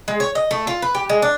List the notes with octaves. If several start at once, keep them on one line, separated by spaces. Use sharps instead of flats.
G#3
C#5
D#5
A3
F4
B4
G4
G#3
D4